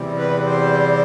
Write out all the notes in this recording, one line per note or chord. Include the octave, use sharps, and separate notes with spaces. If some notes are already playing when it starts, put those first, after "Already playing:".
Already playing: E2 C3 G3
B4
C5